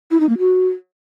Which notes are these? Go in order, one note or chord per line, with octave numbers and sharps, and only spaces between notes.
E4
D#4
A#3
F#4